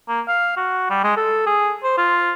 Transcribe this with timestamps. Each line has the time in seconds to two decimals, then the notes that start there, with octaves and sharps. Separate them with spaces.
0.08 A#3
0.28 F5
0.57 F#4
0.90 G3
1.04 G#3
1.17 A4
1.47 G#4
1.83 C5
1.98 F4